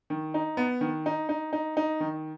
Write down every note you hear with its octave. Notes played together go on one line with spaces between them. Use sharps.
D#3
D#4
B3
D#3
D#4
D#4
D#4
D#4
D#3